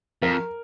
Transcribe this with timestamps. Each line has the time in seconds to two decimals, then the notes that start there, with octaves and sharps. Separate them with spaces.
0.22 F2 A#4